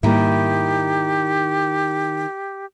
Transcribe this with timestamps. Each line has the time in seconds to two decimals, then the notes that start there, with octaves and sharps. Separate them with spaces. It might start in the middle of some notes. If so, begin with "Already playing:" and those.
0.03 G#2 D#3 G3 A#3 E4 G4